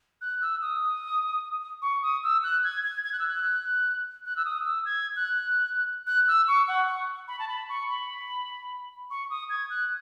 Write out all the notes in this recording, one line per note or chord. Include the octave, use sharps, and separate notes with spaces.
F#6
E6
D#6
C#6
D#6
E6
F#6
G#6
G#6
G#6
F#6
E6
F#6
F#6
E6
D#6
E6
G#6
F#6
F#6
E6
C#6
F#5
C#6
B5
A5
B5
C#6
B5
C#6
D#6
G#6
F#6